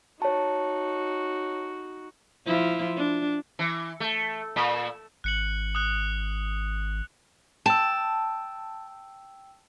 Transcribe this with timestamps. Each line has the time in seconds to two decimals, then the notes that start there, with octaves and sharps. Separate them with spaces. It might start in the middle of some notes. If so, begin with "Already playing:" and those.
0.22 D#4 F#4 C#5 A5
2.46 F3 E4 F4
2.97 D4
3.59 E3
4.00 A3
4.56 A#2
5.24 G#1 F#6 C#7 F#7
5.75 D#6 F#6
7.66 G5 A5 E6